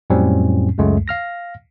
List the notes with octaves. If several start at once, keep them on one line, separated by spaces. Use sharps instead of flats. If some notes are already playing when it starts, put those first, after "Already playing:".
F2 A2 F#3 G3 C4 C#4
C#2 F#2 G#3 A3
F5 F6 A#6